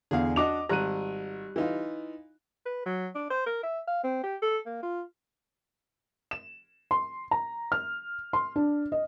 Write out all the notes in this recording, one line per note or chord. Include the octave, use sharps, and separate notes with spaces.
E2 D3 G#4 F5
D4 F#4 D#5 D6 F7
G#1 G3 A#5 F#6 D#7
E3 D#4 F4
B4
F#3
D4
C5
A#4
E5
F5
C4
G4
A4
A#3
F4
E7
C6
A#5
F6
C6
D4
D#5